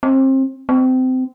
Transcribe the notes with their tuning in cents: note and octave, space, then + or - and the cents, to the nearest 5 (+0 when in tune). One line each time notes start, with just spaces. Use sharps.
C4 +30
C4 -25